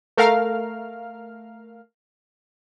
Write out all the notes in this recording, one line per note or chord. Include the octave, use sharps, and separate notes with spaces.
A3 A#4 F5 F6